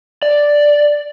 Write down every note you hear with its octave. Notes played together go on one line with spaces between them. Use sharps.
D5